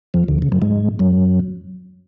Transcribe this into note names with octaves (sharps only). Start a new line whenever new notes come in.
F2 F3
D2 D3
C#3
F#2 F#3
G#2 G#3
F#2 F#3